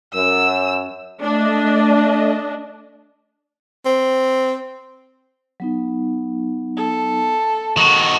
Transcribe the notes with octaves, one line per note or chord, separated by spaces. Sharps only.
F#2 E6
A3 D4 D#5
C4
F#3 B3 D#4
A4
D#3 F#4